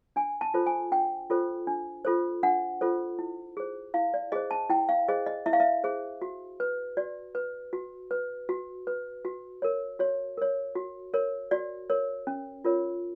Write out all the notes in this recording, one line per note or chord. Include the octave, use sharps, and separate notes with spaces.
D4 G#5
A5
F4 A4 C5
G#5
D4 G5
F4 A4 C5
D4
F4 A4 C5
D4 F#5
F4 A4 C5
E4
G#4 C5
E4 F5
D5
G#4 C5 D#5
A5
E4 G5
F5
G#4 C5 D#5
D#5
E4 E5
F5
E5
G#4 C5
F#4
B4
F#4 D5
B4
F#4
B4
F#4
B4
F#4
A#4 C#5
F#4 C#5
A#4 C#5
F#4
A#4 C#5
F#4 D5
A#4 C#5
C#4
F4 A#4 C#5